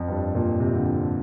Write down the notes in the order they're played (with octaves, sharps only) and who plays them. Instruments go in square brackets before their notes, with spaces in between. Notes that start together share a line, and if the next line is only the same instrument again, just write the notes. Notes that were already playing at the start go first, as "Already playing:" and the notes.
Already playing: [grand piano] F2
G2
A#2
C3
D3
C3